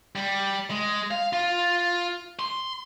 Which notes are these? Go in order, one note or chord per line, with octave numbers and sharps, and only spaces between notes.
G3
G#3
F5
F4
C6